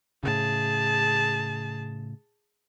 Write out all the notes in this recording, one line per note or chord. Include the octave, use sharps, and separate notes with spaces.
A2 C#3 G#4 A5